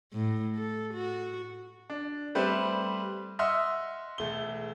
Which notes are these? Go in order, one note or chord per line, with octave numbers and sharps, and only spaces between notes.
A2
A4
F#4
D4
G3 A3 C4 B4 C5
D#5 E5 F#5 C6 E6 F6
E1 A3 G7